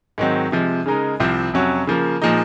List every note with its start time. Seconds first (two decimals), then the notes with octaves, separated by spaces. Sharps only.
0.18 G#2 D#3 F#3 C4
0.52 C3 F3 G#3
0.86 C#3 G#3 D#4 A#4
1.20 C2 C3 F3 C4
1.54 F2 C3 F#3 C#4 F#4
1.87 C#3 F3 A#3
2.22 A#2 F3 G#3 D#4